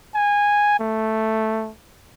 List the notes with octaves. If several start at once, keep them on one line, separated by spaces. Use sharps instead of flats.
G#5
A3